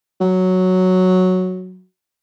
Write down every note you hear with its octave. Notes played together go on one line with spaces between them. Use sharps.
F#3